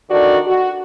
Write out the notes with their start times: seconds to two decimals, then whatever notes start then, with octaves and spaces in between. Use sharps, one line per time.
0.10 D#3 D4 F#4 A4 D5
0.47 F#4